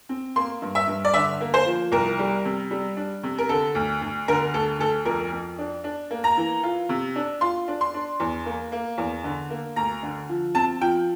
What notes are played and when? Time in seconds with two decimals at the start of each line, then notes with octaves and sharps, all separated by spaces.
0.09 C4
0.36 A#3 C6
0.62 G2
0.75 E5
0.88 G2
1.05 D5
1.14 D3 E5
1.41 A#3
1.54 C5
1.66 F3
1.92 C2 A#4
2.19 G3
2.45 C3
2.71 G3
2.97 D4
3.23 C3
3.38 A#4
3.49 D3 A4
3.75 D2
4.02 D2
4.28 D3 A#4
4.54 D2 A4
4.79 D2 A4
5.05 F2 A#4
5.32 F2
5.59 D4
5.84 D4
6.11 A#3
6.24 A#5
6.37 E3
6.63 F4
6.89 C3
7.16 D4
7.41 F4 C6
7.68 D4
7.81 C6
7.94 D4
8.20 E2
8.46 A#3
8.72 A#3
8.98 E2
9.24 D3
9.50 A#3
9.76 D2 A#5
10.03 D3
10.29 F3
10.55 C4 A5
10.81 F3 G5